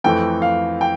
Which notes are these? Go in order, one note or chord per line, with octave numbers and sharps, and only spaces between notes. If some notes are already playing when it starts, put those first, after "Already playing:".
F2 E3 A3 G5
F5
G5